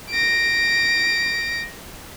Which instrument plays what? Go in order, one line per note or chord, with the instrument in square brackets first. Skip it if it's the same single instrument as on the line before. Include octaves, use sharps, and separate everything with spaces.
[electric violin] A#6 D7